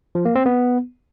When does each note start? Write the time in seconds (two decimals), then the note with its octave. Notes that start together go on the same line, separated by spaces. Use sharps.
0.15 F3
0.25 A#3
0.35 C4
0.46 B3